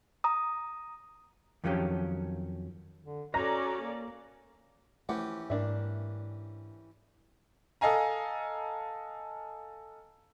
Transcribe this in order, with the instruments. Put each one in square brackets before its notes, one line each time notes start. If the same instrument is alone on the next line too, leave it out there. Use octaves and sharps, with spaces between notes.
[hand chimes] A#5 D#6
[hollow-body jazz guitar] F2 D#3 F3 F#3 C#4 G4
[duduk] D3
[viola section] C#4 A4 D5 [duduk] F#4 [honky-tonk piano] A#5 A#6
[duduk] A#3
[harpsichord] E3 C#4 G4 [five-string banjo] F3 F#5 [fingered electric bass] A3
[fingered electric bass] G#2 [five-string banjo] A#3 D4 E5
[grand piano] A4 D#5 F5 G#5 A#5